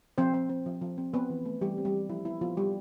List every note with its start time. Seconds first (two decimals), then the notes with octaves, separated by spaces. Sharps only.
0.18 F3 C4 C5
0.34 C4
0.50 C4
0.66 F3
0.82 F3
0.98 C4
1.14 B3 C4 B4
1.30 E3
1.45 A3
1.61 E3 G3 G4
1.78 C4
1.85 G3 G4
1.93 E3
2.09 F3 E4
2.25 B3 E4
2.41 F3 B3 F4
2.57 F3 G3 G4